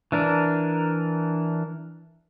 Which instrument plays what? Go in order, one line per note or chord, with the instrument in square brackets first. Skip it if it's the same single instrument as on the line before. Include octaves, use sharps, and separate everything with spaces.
[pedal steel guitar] E3 D4 A#4